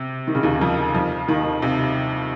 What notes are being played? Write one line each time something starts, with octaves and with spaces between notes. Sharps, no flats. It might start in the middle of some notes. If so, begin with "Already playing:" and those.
Already playing: C3
D#3
C#3
D#2 D#3
F2 F3
F2 F3
D#2 D#3
C3